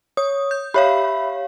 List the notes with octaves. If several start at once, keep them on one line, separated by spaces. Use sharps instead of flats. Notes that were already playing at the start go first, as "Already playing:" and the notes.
C#5 D#6
G6
G4 C#5 E5 F5 B5